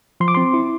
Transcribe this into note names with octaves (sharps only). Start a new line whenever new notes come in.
F3 C6
D6
C4 C6
E4